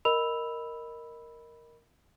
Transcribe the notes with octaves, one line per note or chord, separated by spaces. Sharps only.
A#4 D#5 B5 E6 F7